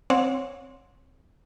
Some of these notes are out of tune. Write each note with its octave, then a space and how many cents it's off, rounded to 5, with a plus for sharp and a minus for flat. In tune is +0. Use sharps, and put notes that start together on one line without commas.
C4 +0 C#5 +0 F#5 -40